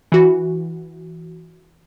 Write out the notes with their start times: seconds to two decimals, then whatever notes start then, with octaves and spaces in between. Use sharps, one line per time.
0.12 E3 F#4